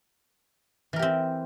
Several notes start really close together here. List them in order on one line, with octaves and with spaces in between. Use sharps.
E3 A#4 G4 C4